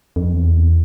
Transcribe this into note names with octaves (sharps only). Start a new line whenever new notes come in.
F2
E2